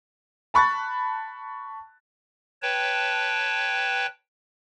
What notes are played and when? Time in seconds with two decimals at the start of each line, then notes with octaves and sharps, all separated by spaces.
0.54 A5 B5 C#6 F#6 A6
2.62 B4 C#5 G5 A5